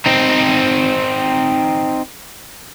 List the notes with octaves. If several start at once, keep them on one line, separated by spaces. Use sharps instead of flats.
C4 D#4